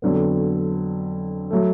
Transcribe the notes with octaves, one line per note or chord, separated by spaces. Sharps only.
F2 D3 F#3 B3
F#3 A3